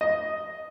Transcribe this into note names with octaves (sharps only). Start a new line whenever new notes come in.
D#5